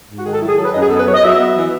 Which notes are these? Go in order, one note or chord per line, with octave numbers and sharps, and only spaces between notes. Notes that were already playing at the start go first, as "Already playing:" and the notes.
G#2
F#4
D#3 G#4
A4
F#3 E4
G#4
F#3 A4
B4
F#2 D#5
G#4
B3 A4
B4
F#3 C#5
D#5
F#3 E5
B3
E3